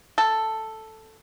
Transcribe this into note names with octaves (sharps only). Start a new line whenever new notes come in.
A4